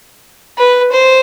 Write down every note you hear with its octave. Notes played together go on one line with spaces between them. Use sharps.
B4
C5